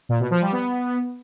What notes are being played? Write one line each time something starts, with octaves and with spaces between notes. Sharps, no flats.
A#2
B2
F3
G3
B3